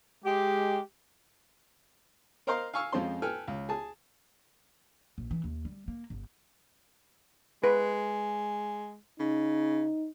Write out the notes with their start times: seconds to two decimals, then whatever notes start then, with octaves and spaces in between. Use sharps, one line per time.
0.24 G#3 G4
2.47 A#4 C5 D#5 F5 A#5 C6
2.74 F5 G#5 C#6 E6 F6
2.92 F2 F3 G#3 C#4 C5 C6
3.22 A4 B4 G5 G#5 F6
3.48 C#2
3.69 G#4 A5
5.18 A#1
5.31 E3
5.44 D#2
5.65 G3
5.88 A#3
6.10 G1
7.64 G#3 B4
9.20 C#3 D#4